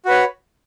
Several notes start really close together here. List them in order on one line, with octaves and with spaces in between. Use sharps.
F#4 B4 C#5